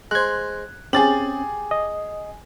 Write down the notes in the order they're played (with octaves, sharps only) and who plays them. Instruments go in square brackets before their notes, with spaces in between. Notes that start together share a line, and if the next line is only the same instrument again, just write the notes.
[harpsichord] G#3 C5 [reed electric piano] F#6 G#6
[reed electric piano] C4 C#4 [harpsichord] G4 [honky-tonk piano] G#4 A6 F#7
[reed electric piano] D#5